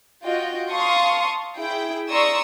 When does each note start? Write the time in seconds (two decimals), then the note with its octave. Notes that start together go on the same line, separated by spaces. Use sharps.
0.23 F4 F#4 D#5 G5
0.70 F5 A5 C6 C#6 D#6
1.58 E4 G#4 G5
2.10 D5 A#5 C6 C#6 D#6 E6